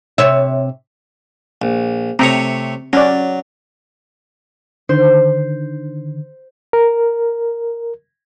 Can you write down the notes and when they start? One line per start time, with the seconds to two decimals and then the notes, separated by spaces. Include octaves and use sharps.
0.18 C3 C#5 E5
1.62 A#1
2.19 C3 A3 C4 C#5 A#5
2.93 F#3 C#4 D5
4.89 D3 D#3 C5
6.73 A#4